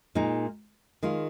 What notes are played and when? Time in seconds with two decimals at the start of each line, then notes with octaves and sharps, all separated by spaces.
0.15 A#2 G#3 D#4
1.03 D#3 G#3 F4